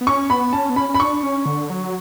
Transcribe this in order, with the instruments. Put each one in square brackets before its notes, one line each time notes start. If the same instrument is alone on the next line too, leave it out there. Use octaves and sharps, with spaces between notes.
[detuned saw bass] B3
[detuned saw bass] C#4 [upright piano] C#6
[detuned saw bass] B3 [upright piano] B5
[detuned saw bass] C#4 [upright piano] A5
[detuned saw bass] B3
[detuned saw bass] C#4 [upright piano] B5
[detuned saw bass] C#4
[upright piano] B5
[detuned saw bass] D4 [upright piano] C#6
[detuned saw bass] C#4
D3
F#3